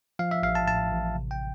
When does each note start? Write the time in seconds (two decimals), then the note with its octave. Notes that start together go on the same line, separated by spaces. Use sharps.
0.19 F3 F5
0.31 E5
0.43 A1 F5
0.55 A5
0.67 A2 A5
0.91 A1
1.15 C3
1.31 G5